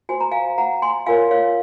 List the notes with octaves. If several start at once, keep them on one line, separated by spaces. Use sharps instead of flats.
F#4 C5 G#5
A#5
F5 G#5
F#5 A#5
G#5 C6
F4 A#4 C#5 F5 G#5
C#5 F5